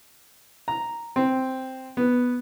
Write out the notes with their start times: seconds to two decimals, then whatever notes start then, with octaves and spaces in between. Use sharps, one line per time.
0.68 A#5
1.16 C4
1.97 B3